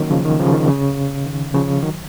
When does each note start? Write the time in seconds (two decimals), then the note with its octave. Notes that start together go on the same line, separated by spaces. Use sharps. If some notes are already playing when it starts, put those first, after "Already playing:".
Already playing: D#3 F#3 A#3 C#4
0.11 C#3 F3
0.25 D#3
0.39 C#3 F3
0.53 D#3
0.68 C#3
1.26 D#3
1.54 C#3 F3
1.83 D#3 F#3